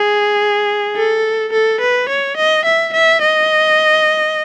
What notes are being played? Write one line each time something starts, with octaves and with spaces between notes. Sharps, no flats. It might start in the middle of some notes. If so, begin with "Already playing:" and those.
Already playing: G#4
A4
A4
B4
C#5
D#5
E5
E5
D#5